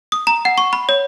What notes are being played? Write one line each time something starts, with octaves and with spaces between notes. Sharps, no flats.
D#6
A#5
F#5
C#6
B5
C#5